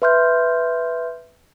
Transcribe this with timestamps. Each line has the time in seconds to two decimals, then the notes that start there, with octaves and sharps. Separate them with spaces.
0.02 B4 E5 C6 F6 G6